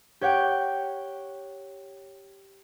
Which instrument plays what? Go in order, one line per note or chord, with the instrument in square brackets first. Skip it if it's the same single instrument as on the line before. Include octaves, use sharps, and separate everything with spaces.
[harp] G4 C#5 F#5 G5